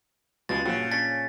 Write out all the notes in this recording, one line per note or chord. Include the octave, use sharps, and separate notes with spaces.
C#2 B2 G3 G#3 A6
G2 A#2 C#3 F3 F#3
C#4 D4 A6 B6